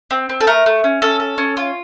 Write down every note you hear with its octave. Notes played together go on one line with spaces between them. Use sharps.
C4
C4
A4
A3 A#4
A3
C#4
C#4 A4
A4
C#4
F4